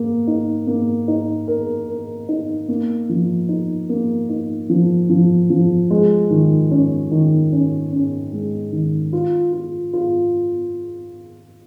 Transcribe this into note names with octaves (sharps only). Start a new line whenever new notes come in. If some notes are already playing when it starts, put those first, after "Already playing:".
Already playing: A#3
D#4
A#3
D#4
A#4
A#4
D#4
A#3
F3
D#4
A#3
D#4
F3
F3
F3
G#3
D#3
C#4
D#3
C#4
C#4
G#3
D#3
F4
F4
F4